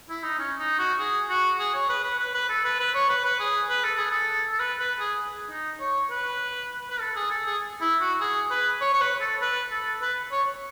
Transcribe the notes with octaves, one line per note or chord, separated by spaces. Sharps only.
E4
D#4
C#4
D#4
F#4
G#4
F#4
G#4
C#5
B4
B4
B4
B4
A4
B4
B4
C#5
B4
B4
G#4
B4
A4
G#4
A4
A4
B4
B4
G#4
D#4
C#5
B4
B4
A4
G#4
A4
G#4
E4
F#4
G#4
B4
C#5
C#5
B4
A4
B4
A4
B4
C#5